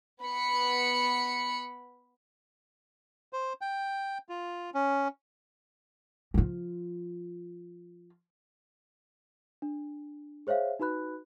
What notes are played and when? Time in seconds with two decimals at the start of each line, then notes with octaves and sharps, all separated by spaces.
0.22 B3 B5 C#7
3.33 C5
3.61 G5
4.29 F4
4.74 C#4
6.34 F3 F4
9.62 D4
10.47 G#4 C5 C#5 E5 F5
10.79 D#4 F#4 B4 B5 F#6